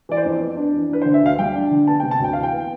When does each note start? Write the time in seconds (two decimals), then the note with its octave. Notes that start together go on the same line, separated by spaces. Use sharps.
0.09 E3 D5
0.17 C5
0.25 F2
0.40 B3
0.57 D4
0.73 E3
0.89 D4 B4
1.02 C5
1.06 D3
1.14 E5
1.23 D2 F5
1.39 G3 G5
1.55 D4
1.71 D3
1.87 B3 A5
2.00 G5
2.03 C3
2.11 A5
2.20 D2 G5
2.33 E3 F5
2.43 G5
2.52 B3